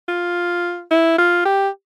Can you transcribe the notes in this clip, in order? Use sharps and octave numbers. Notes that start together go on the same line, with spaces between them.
F4
E4
F4
G4